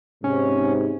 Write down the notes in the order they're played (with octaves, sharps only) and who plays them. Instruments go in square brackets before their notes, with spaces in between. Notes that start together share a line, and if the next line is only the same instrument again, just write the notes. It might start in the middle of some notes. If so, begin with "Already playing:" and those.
[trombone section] G#2 C3 [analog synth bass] C#4